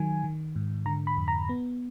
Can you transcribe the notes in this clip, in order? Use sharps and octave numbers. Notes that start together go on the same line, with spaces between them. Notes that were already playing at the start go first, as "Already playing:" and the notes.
Already playing: D#3 F#3 G#5
D#3
G#2
D3 A#5
B5
F2
A#5
B3